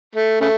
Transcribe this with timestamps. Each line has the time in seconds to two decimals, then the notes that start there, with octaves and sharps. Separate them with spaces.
0.15 A3
0.41 C#3 A3